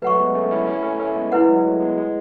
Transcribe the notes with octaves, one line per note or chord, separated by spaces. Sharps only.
F#3 A3 B4 F#5 C#6
G#3 B3
A3 C#4
C#4 E4
C#4 E4
A3 C#4
A3 C#4
G#3 B3
E4 B4 F#5
G#3
F#3
G#3
F#3 A3
G#3 B3
G#3